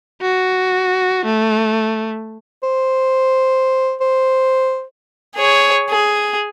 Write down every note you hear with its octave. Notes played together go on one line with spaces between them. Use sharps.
F#4
A3
C5
C5
G#4 C#5
G#4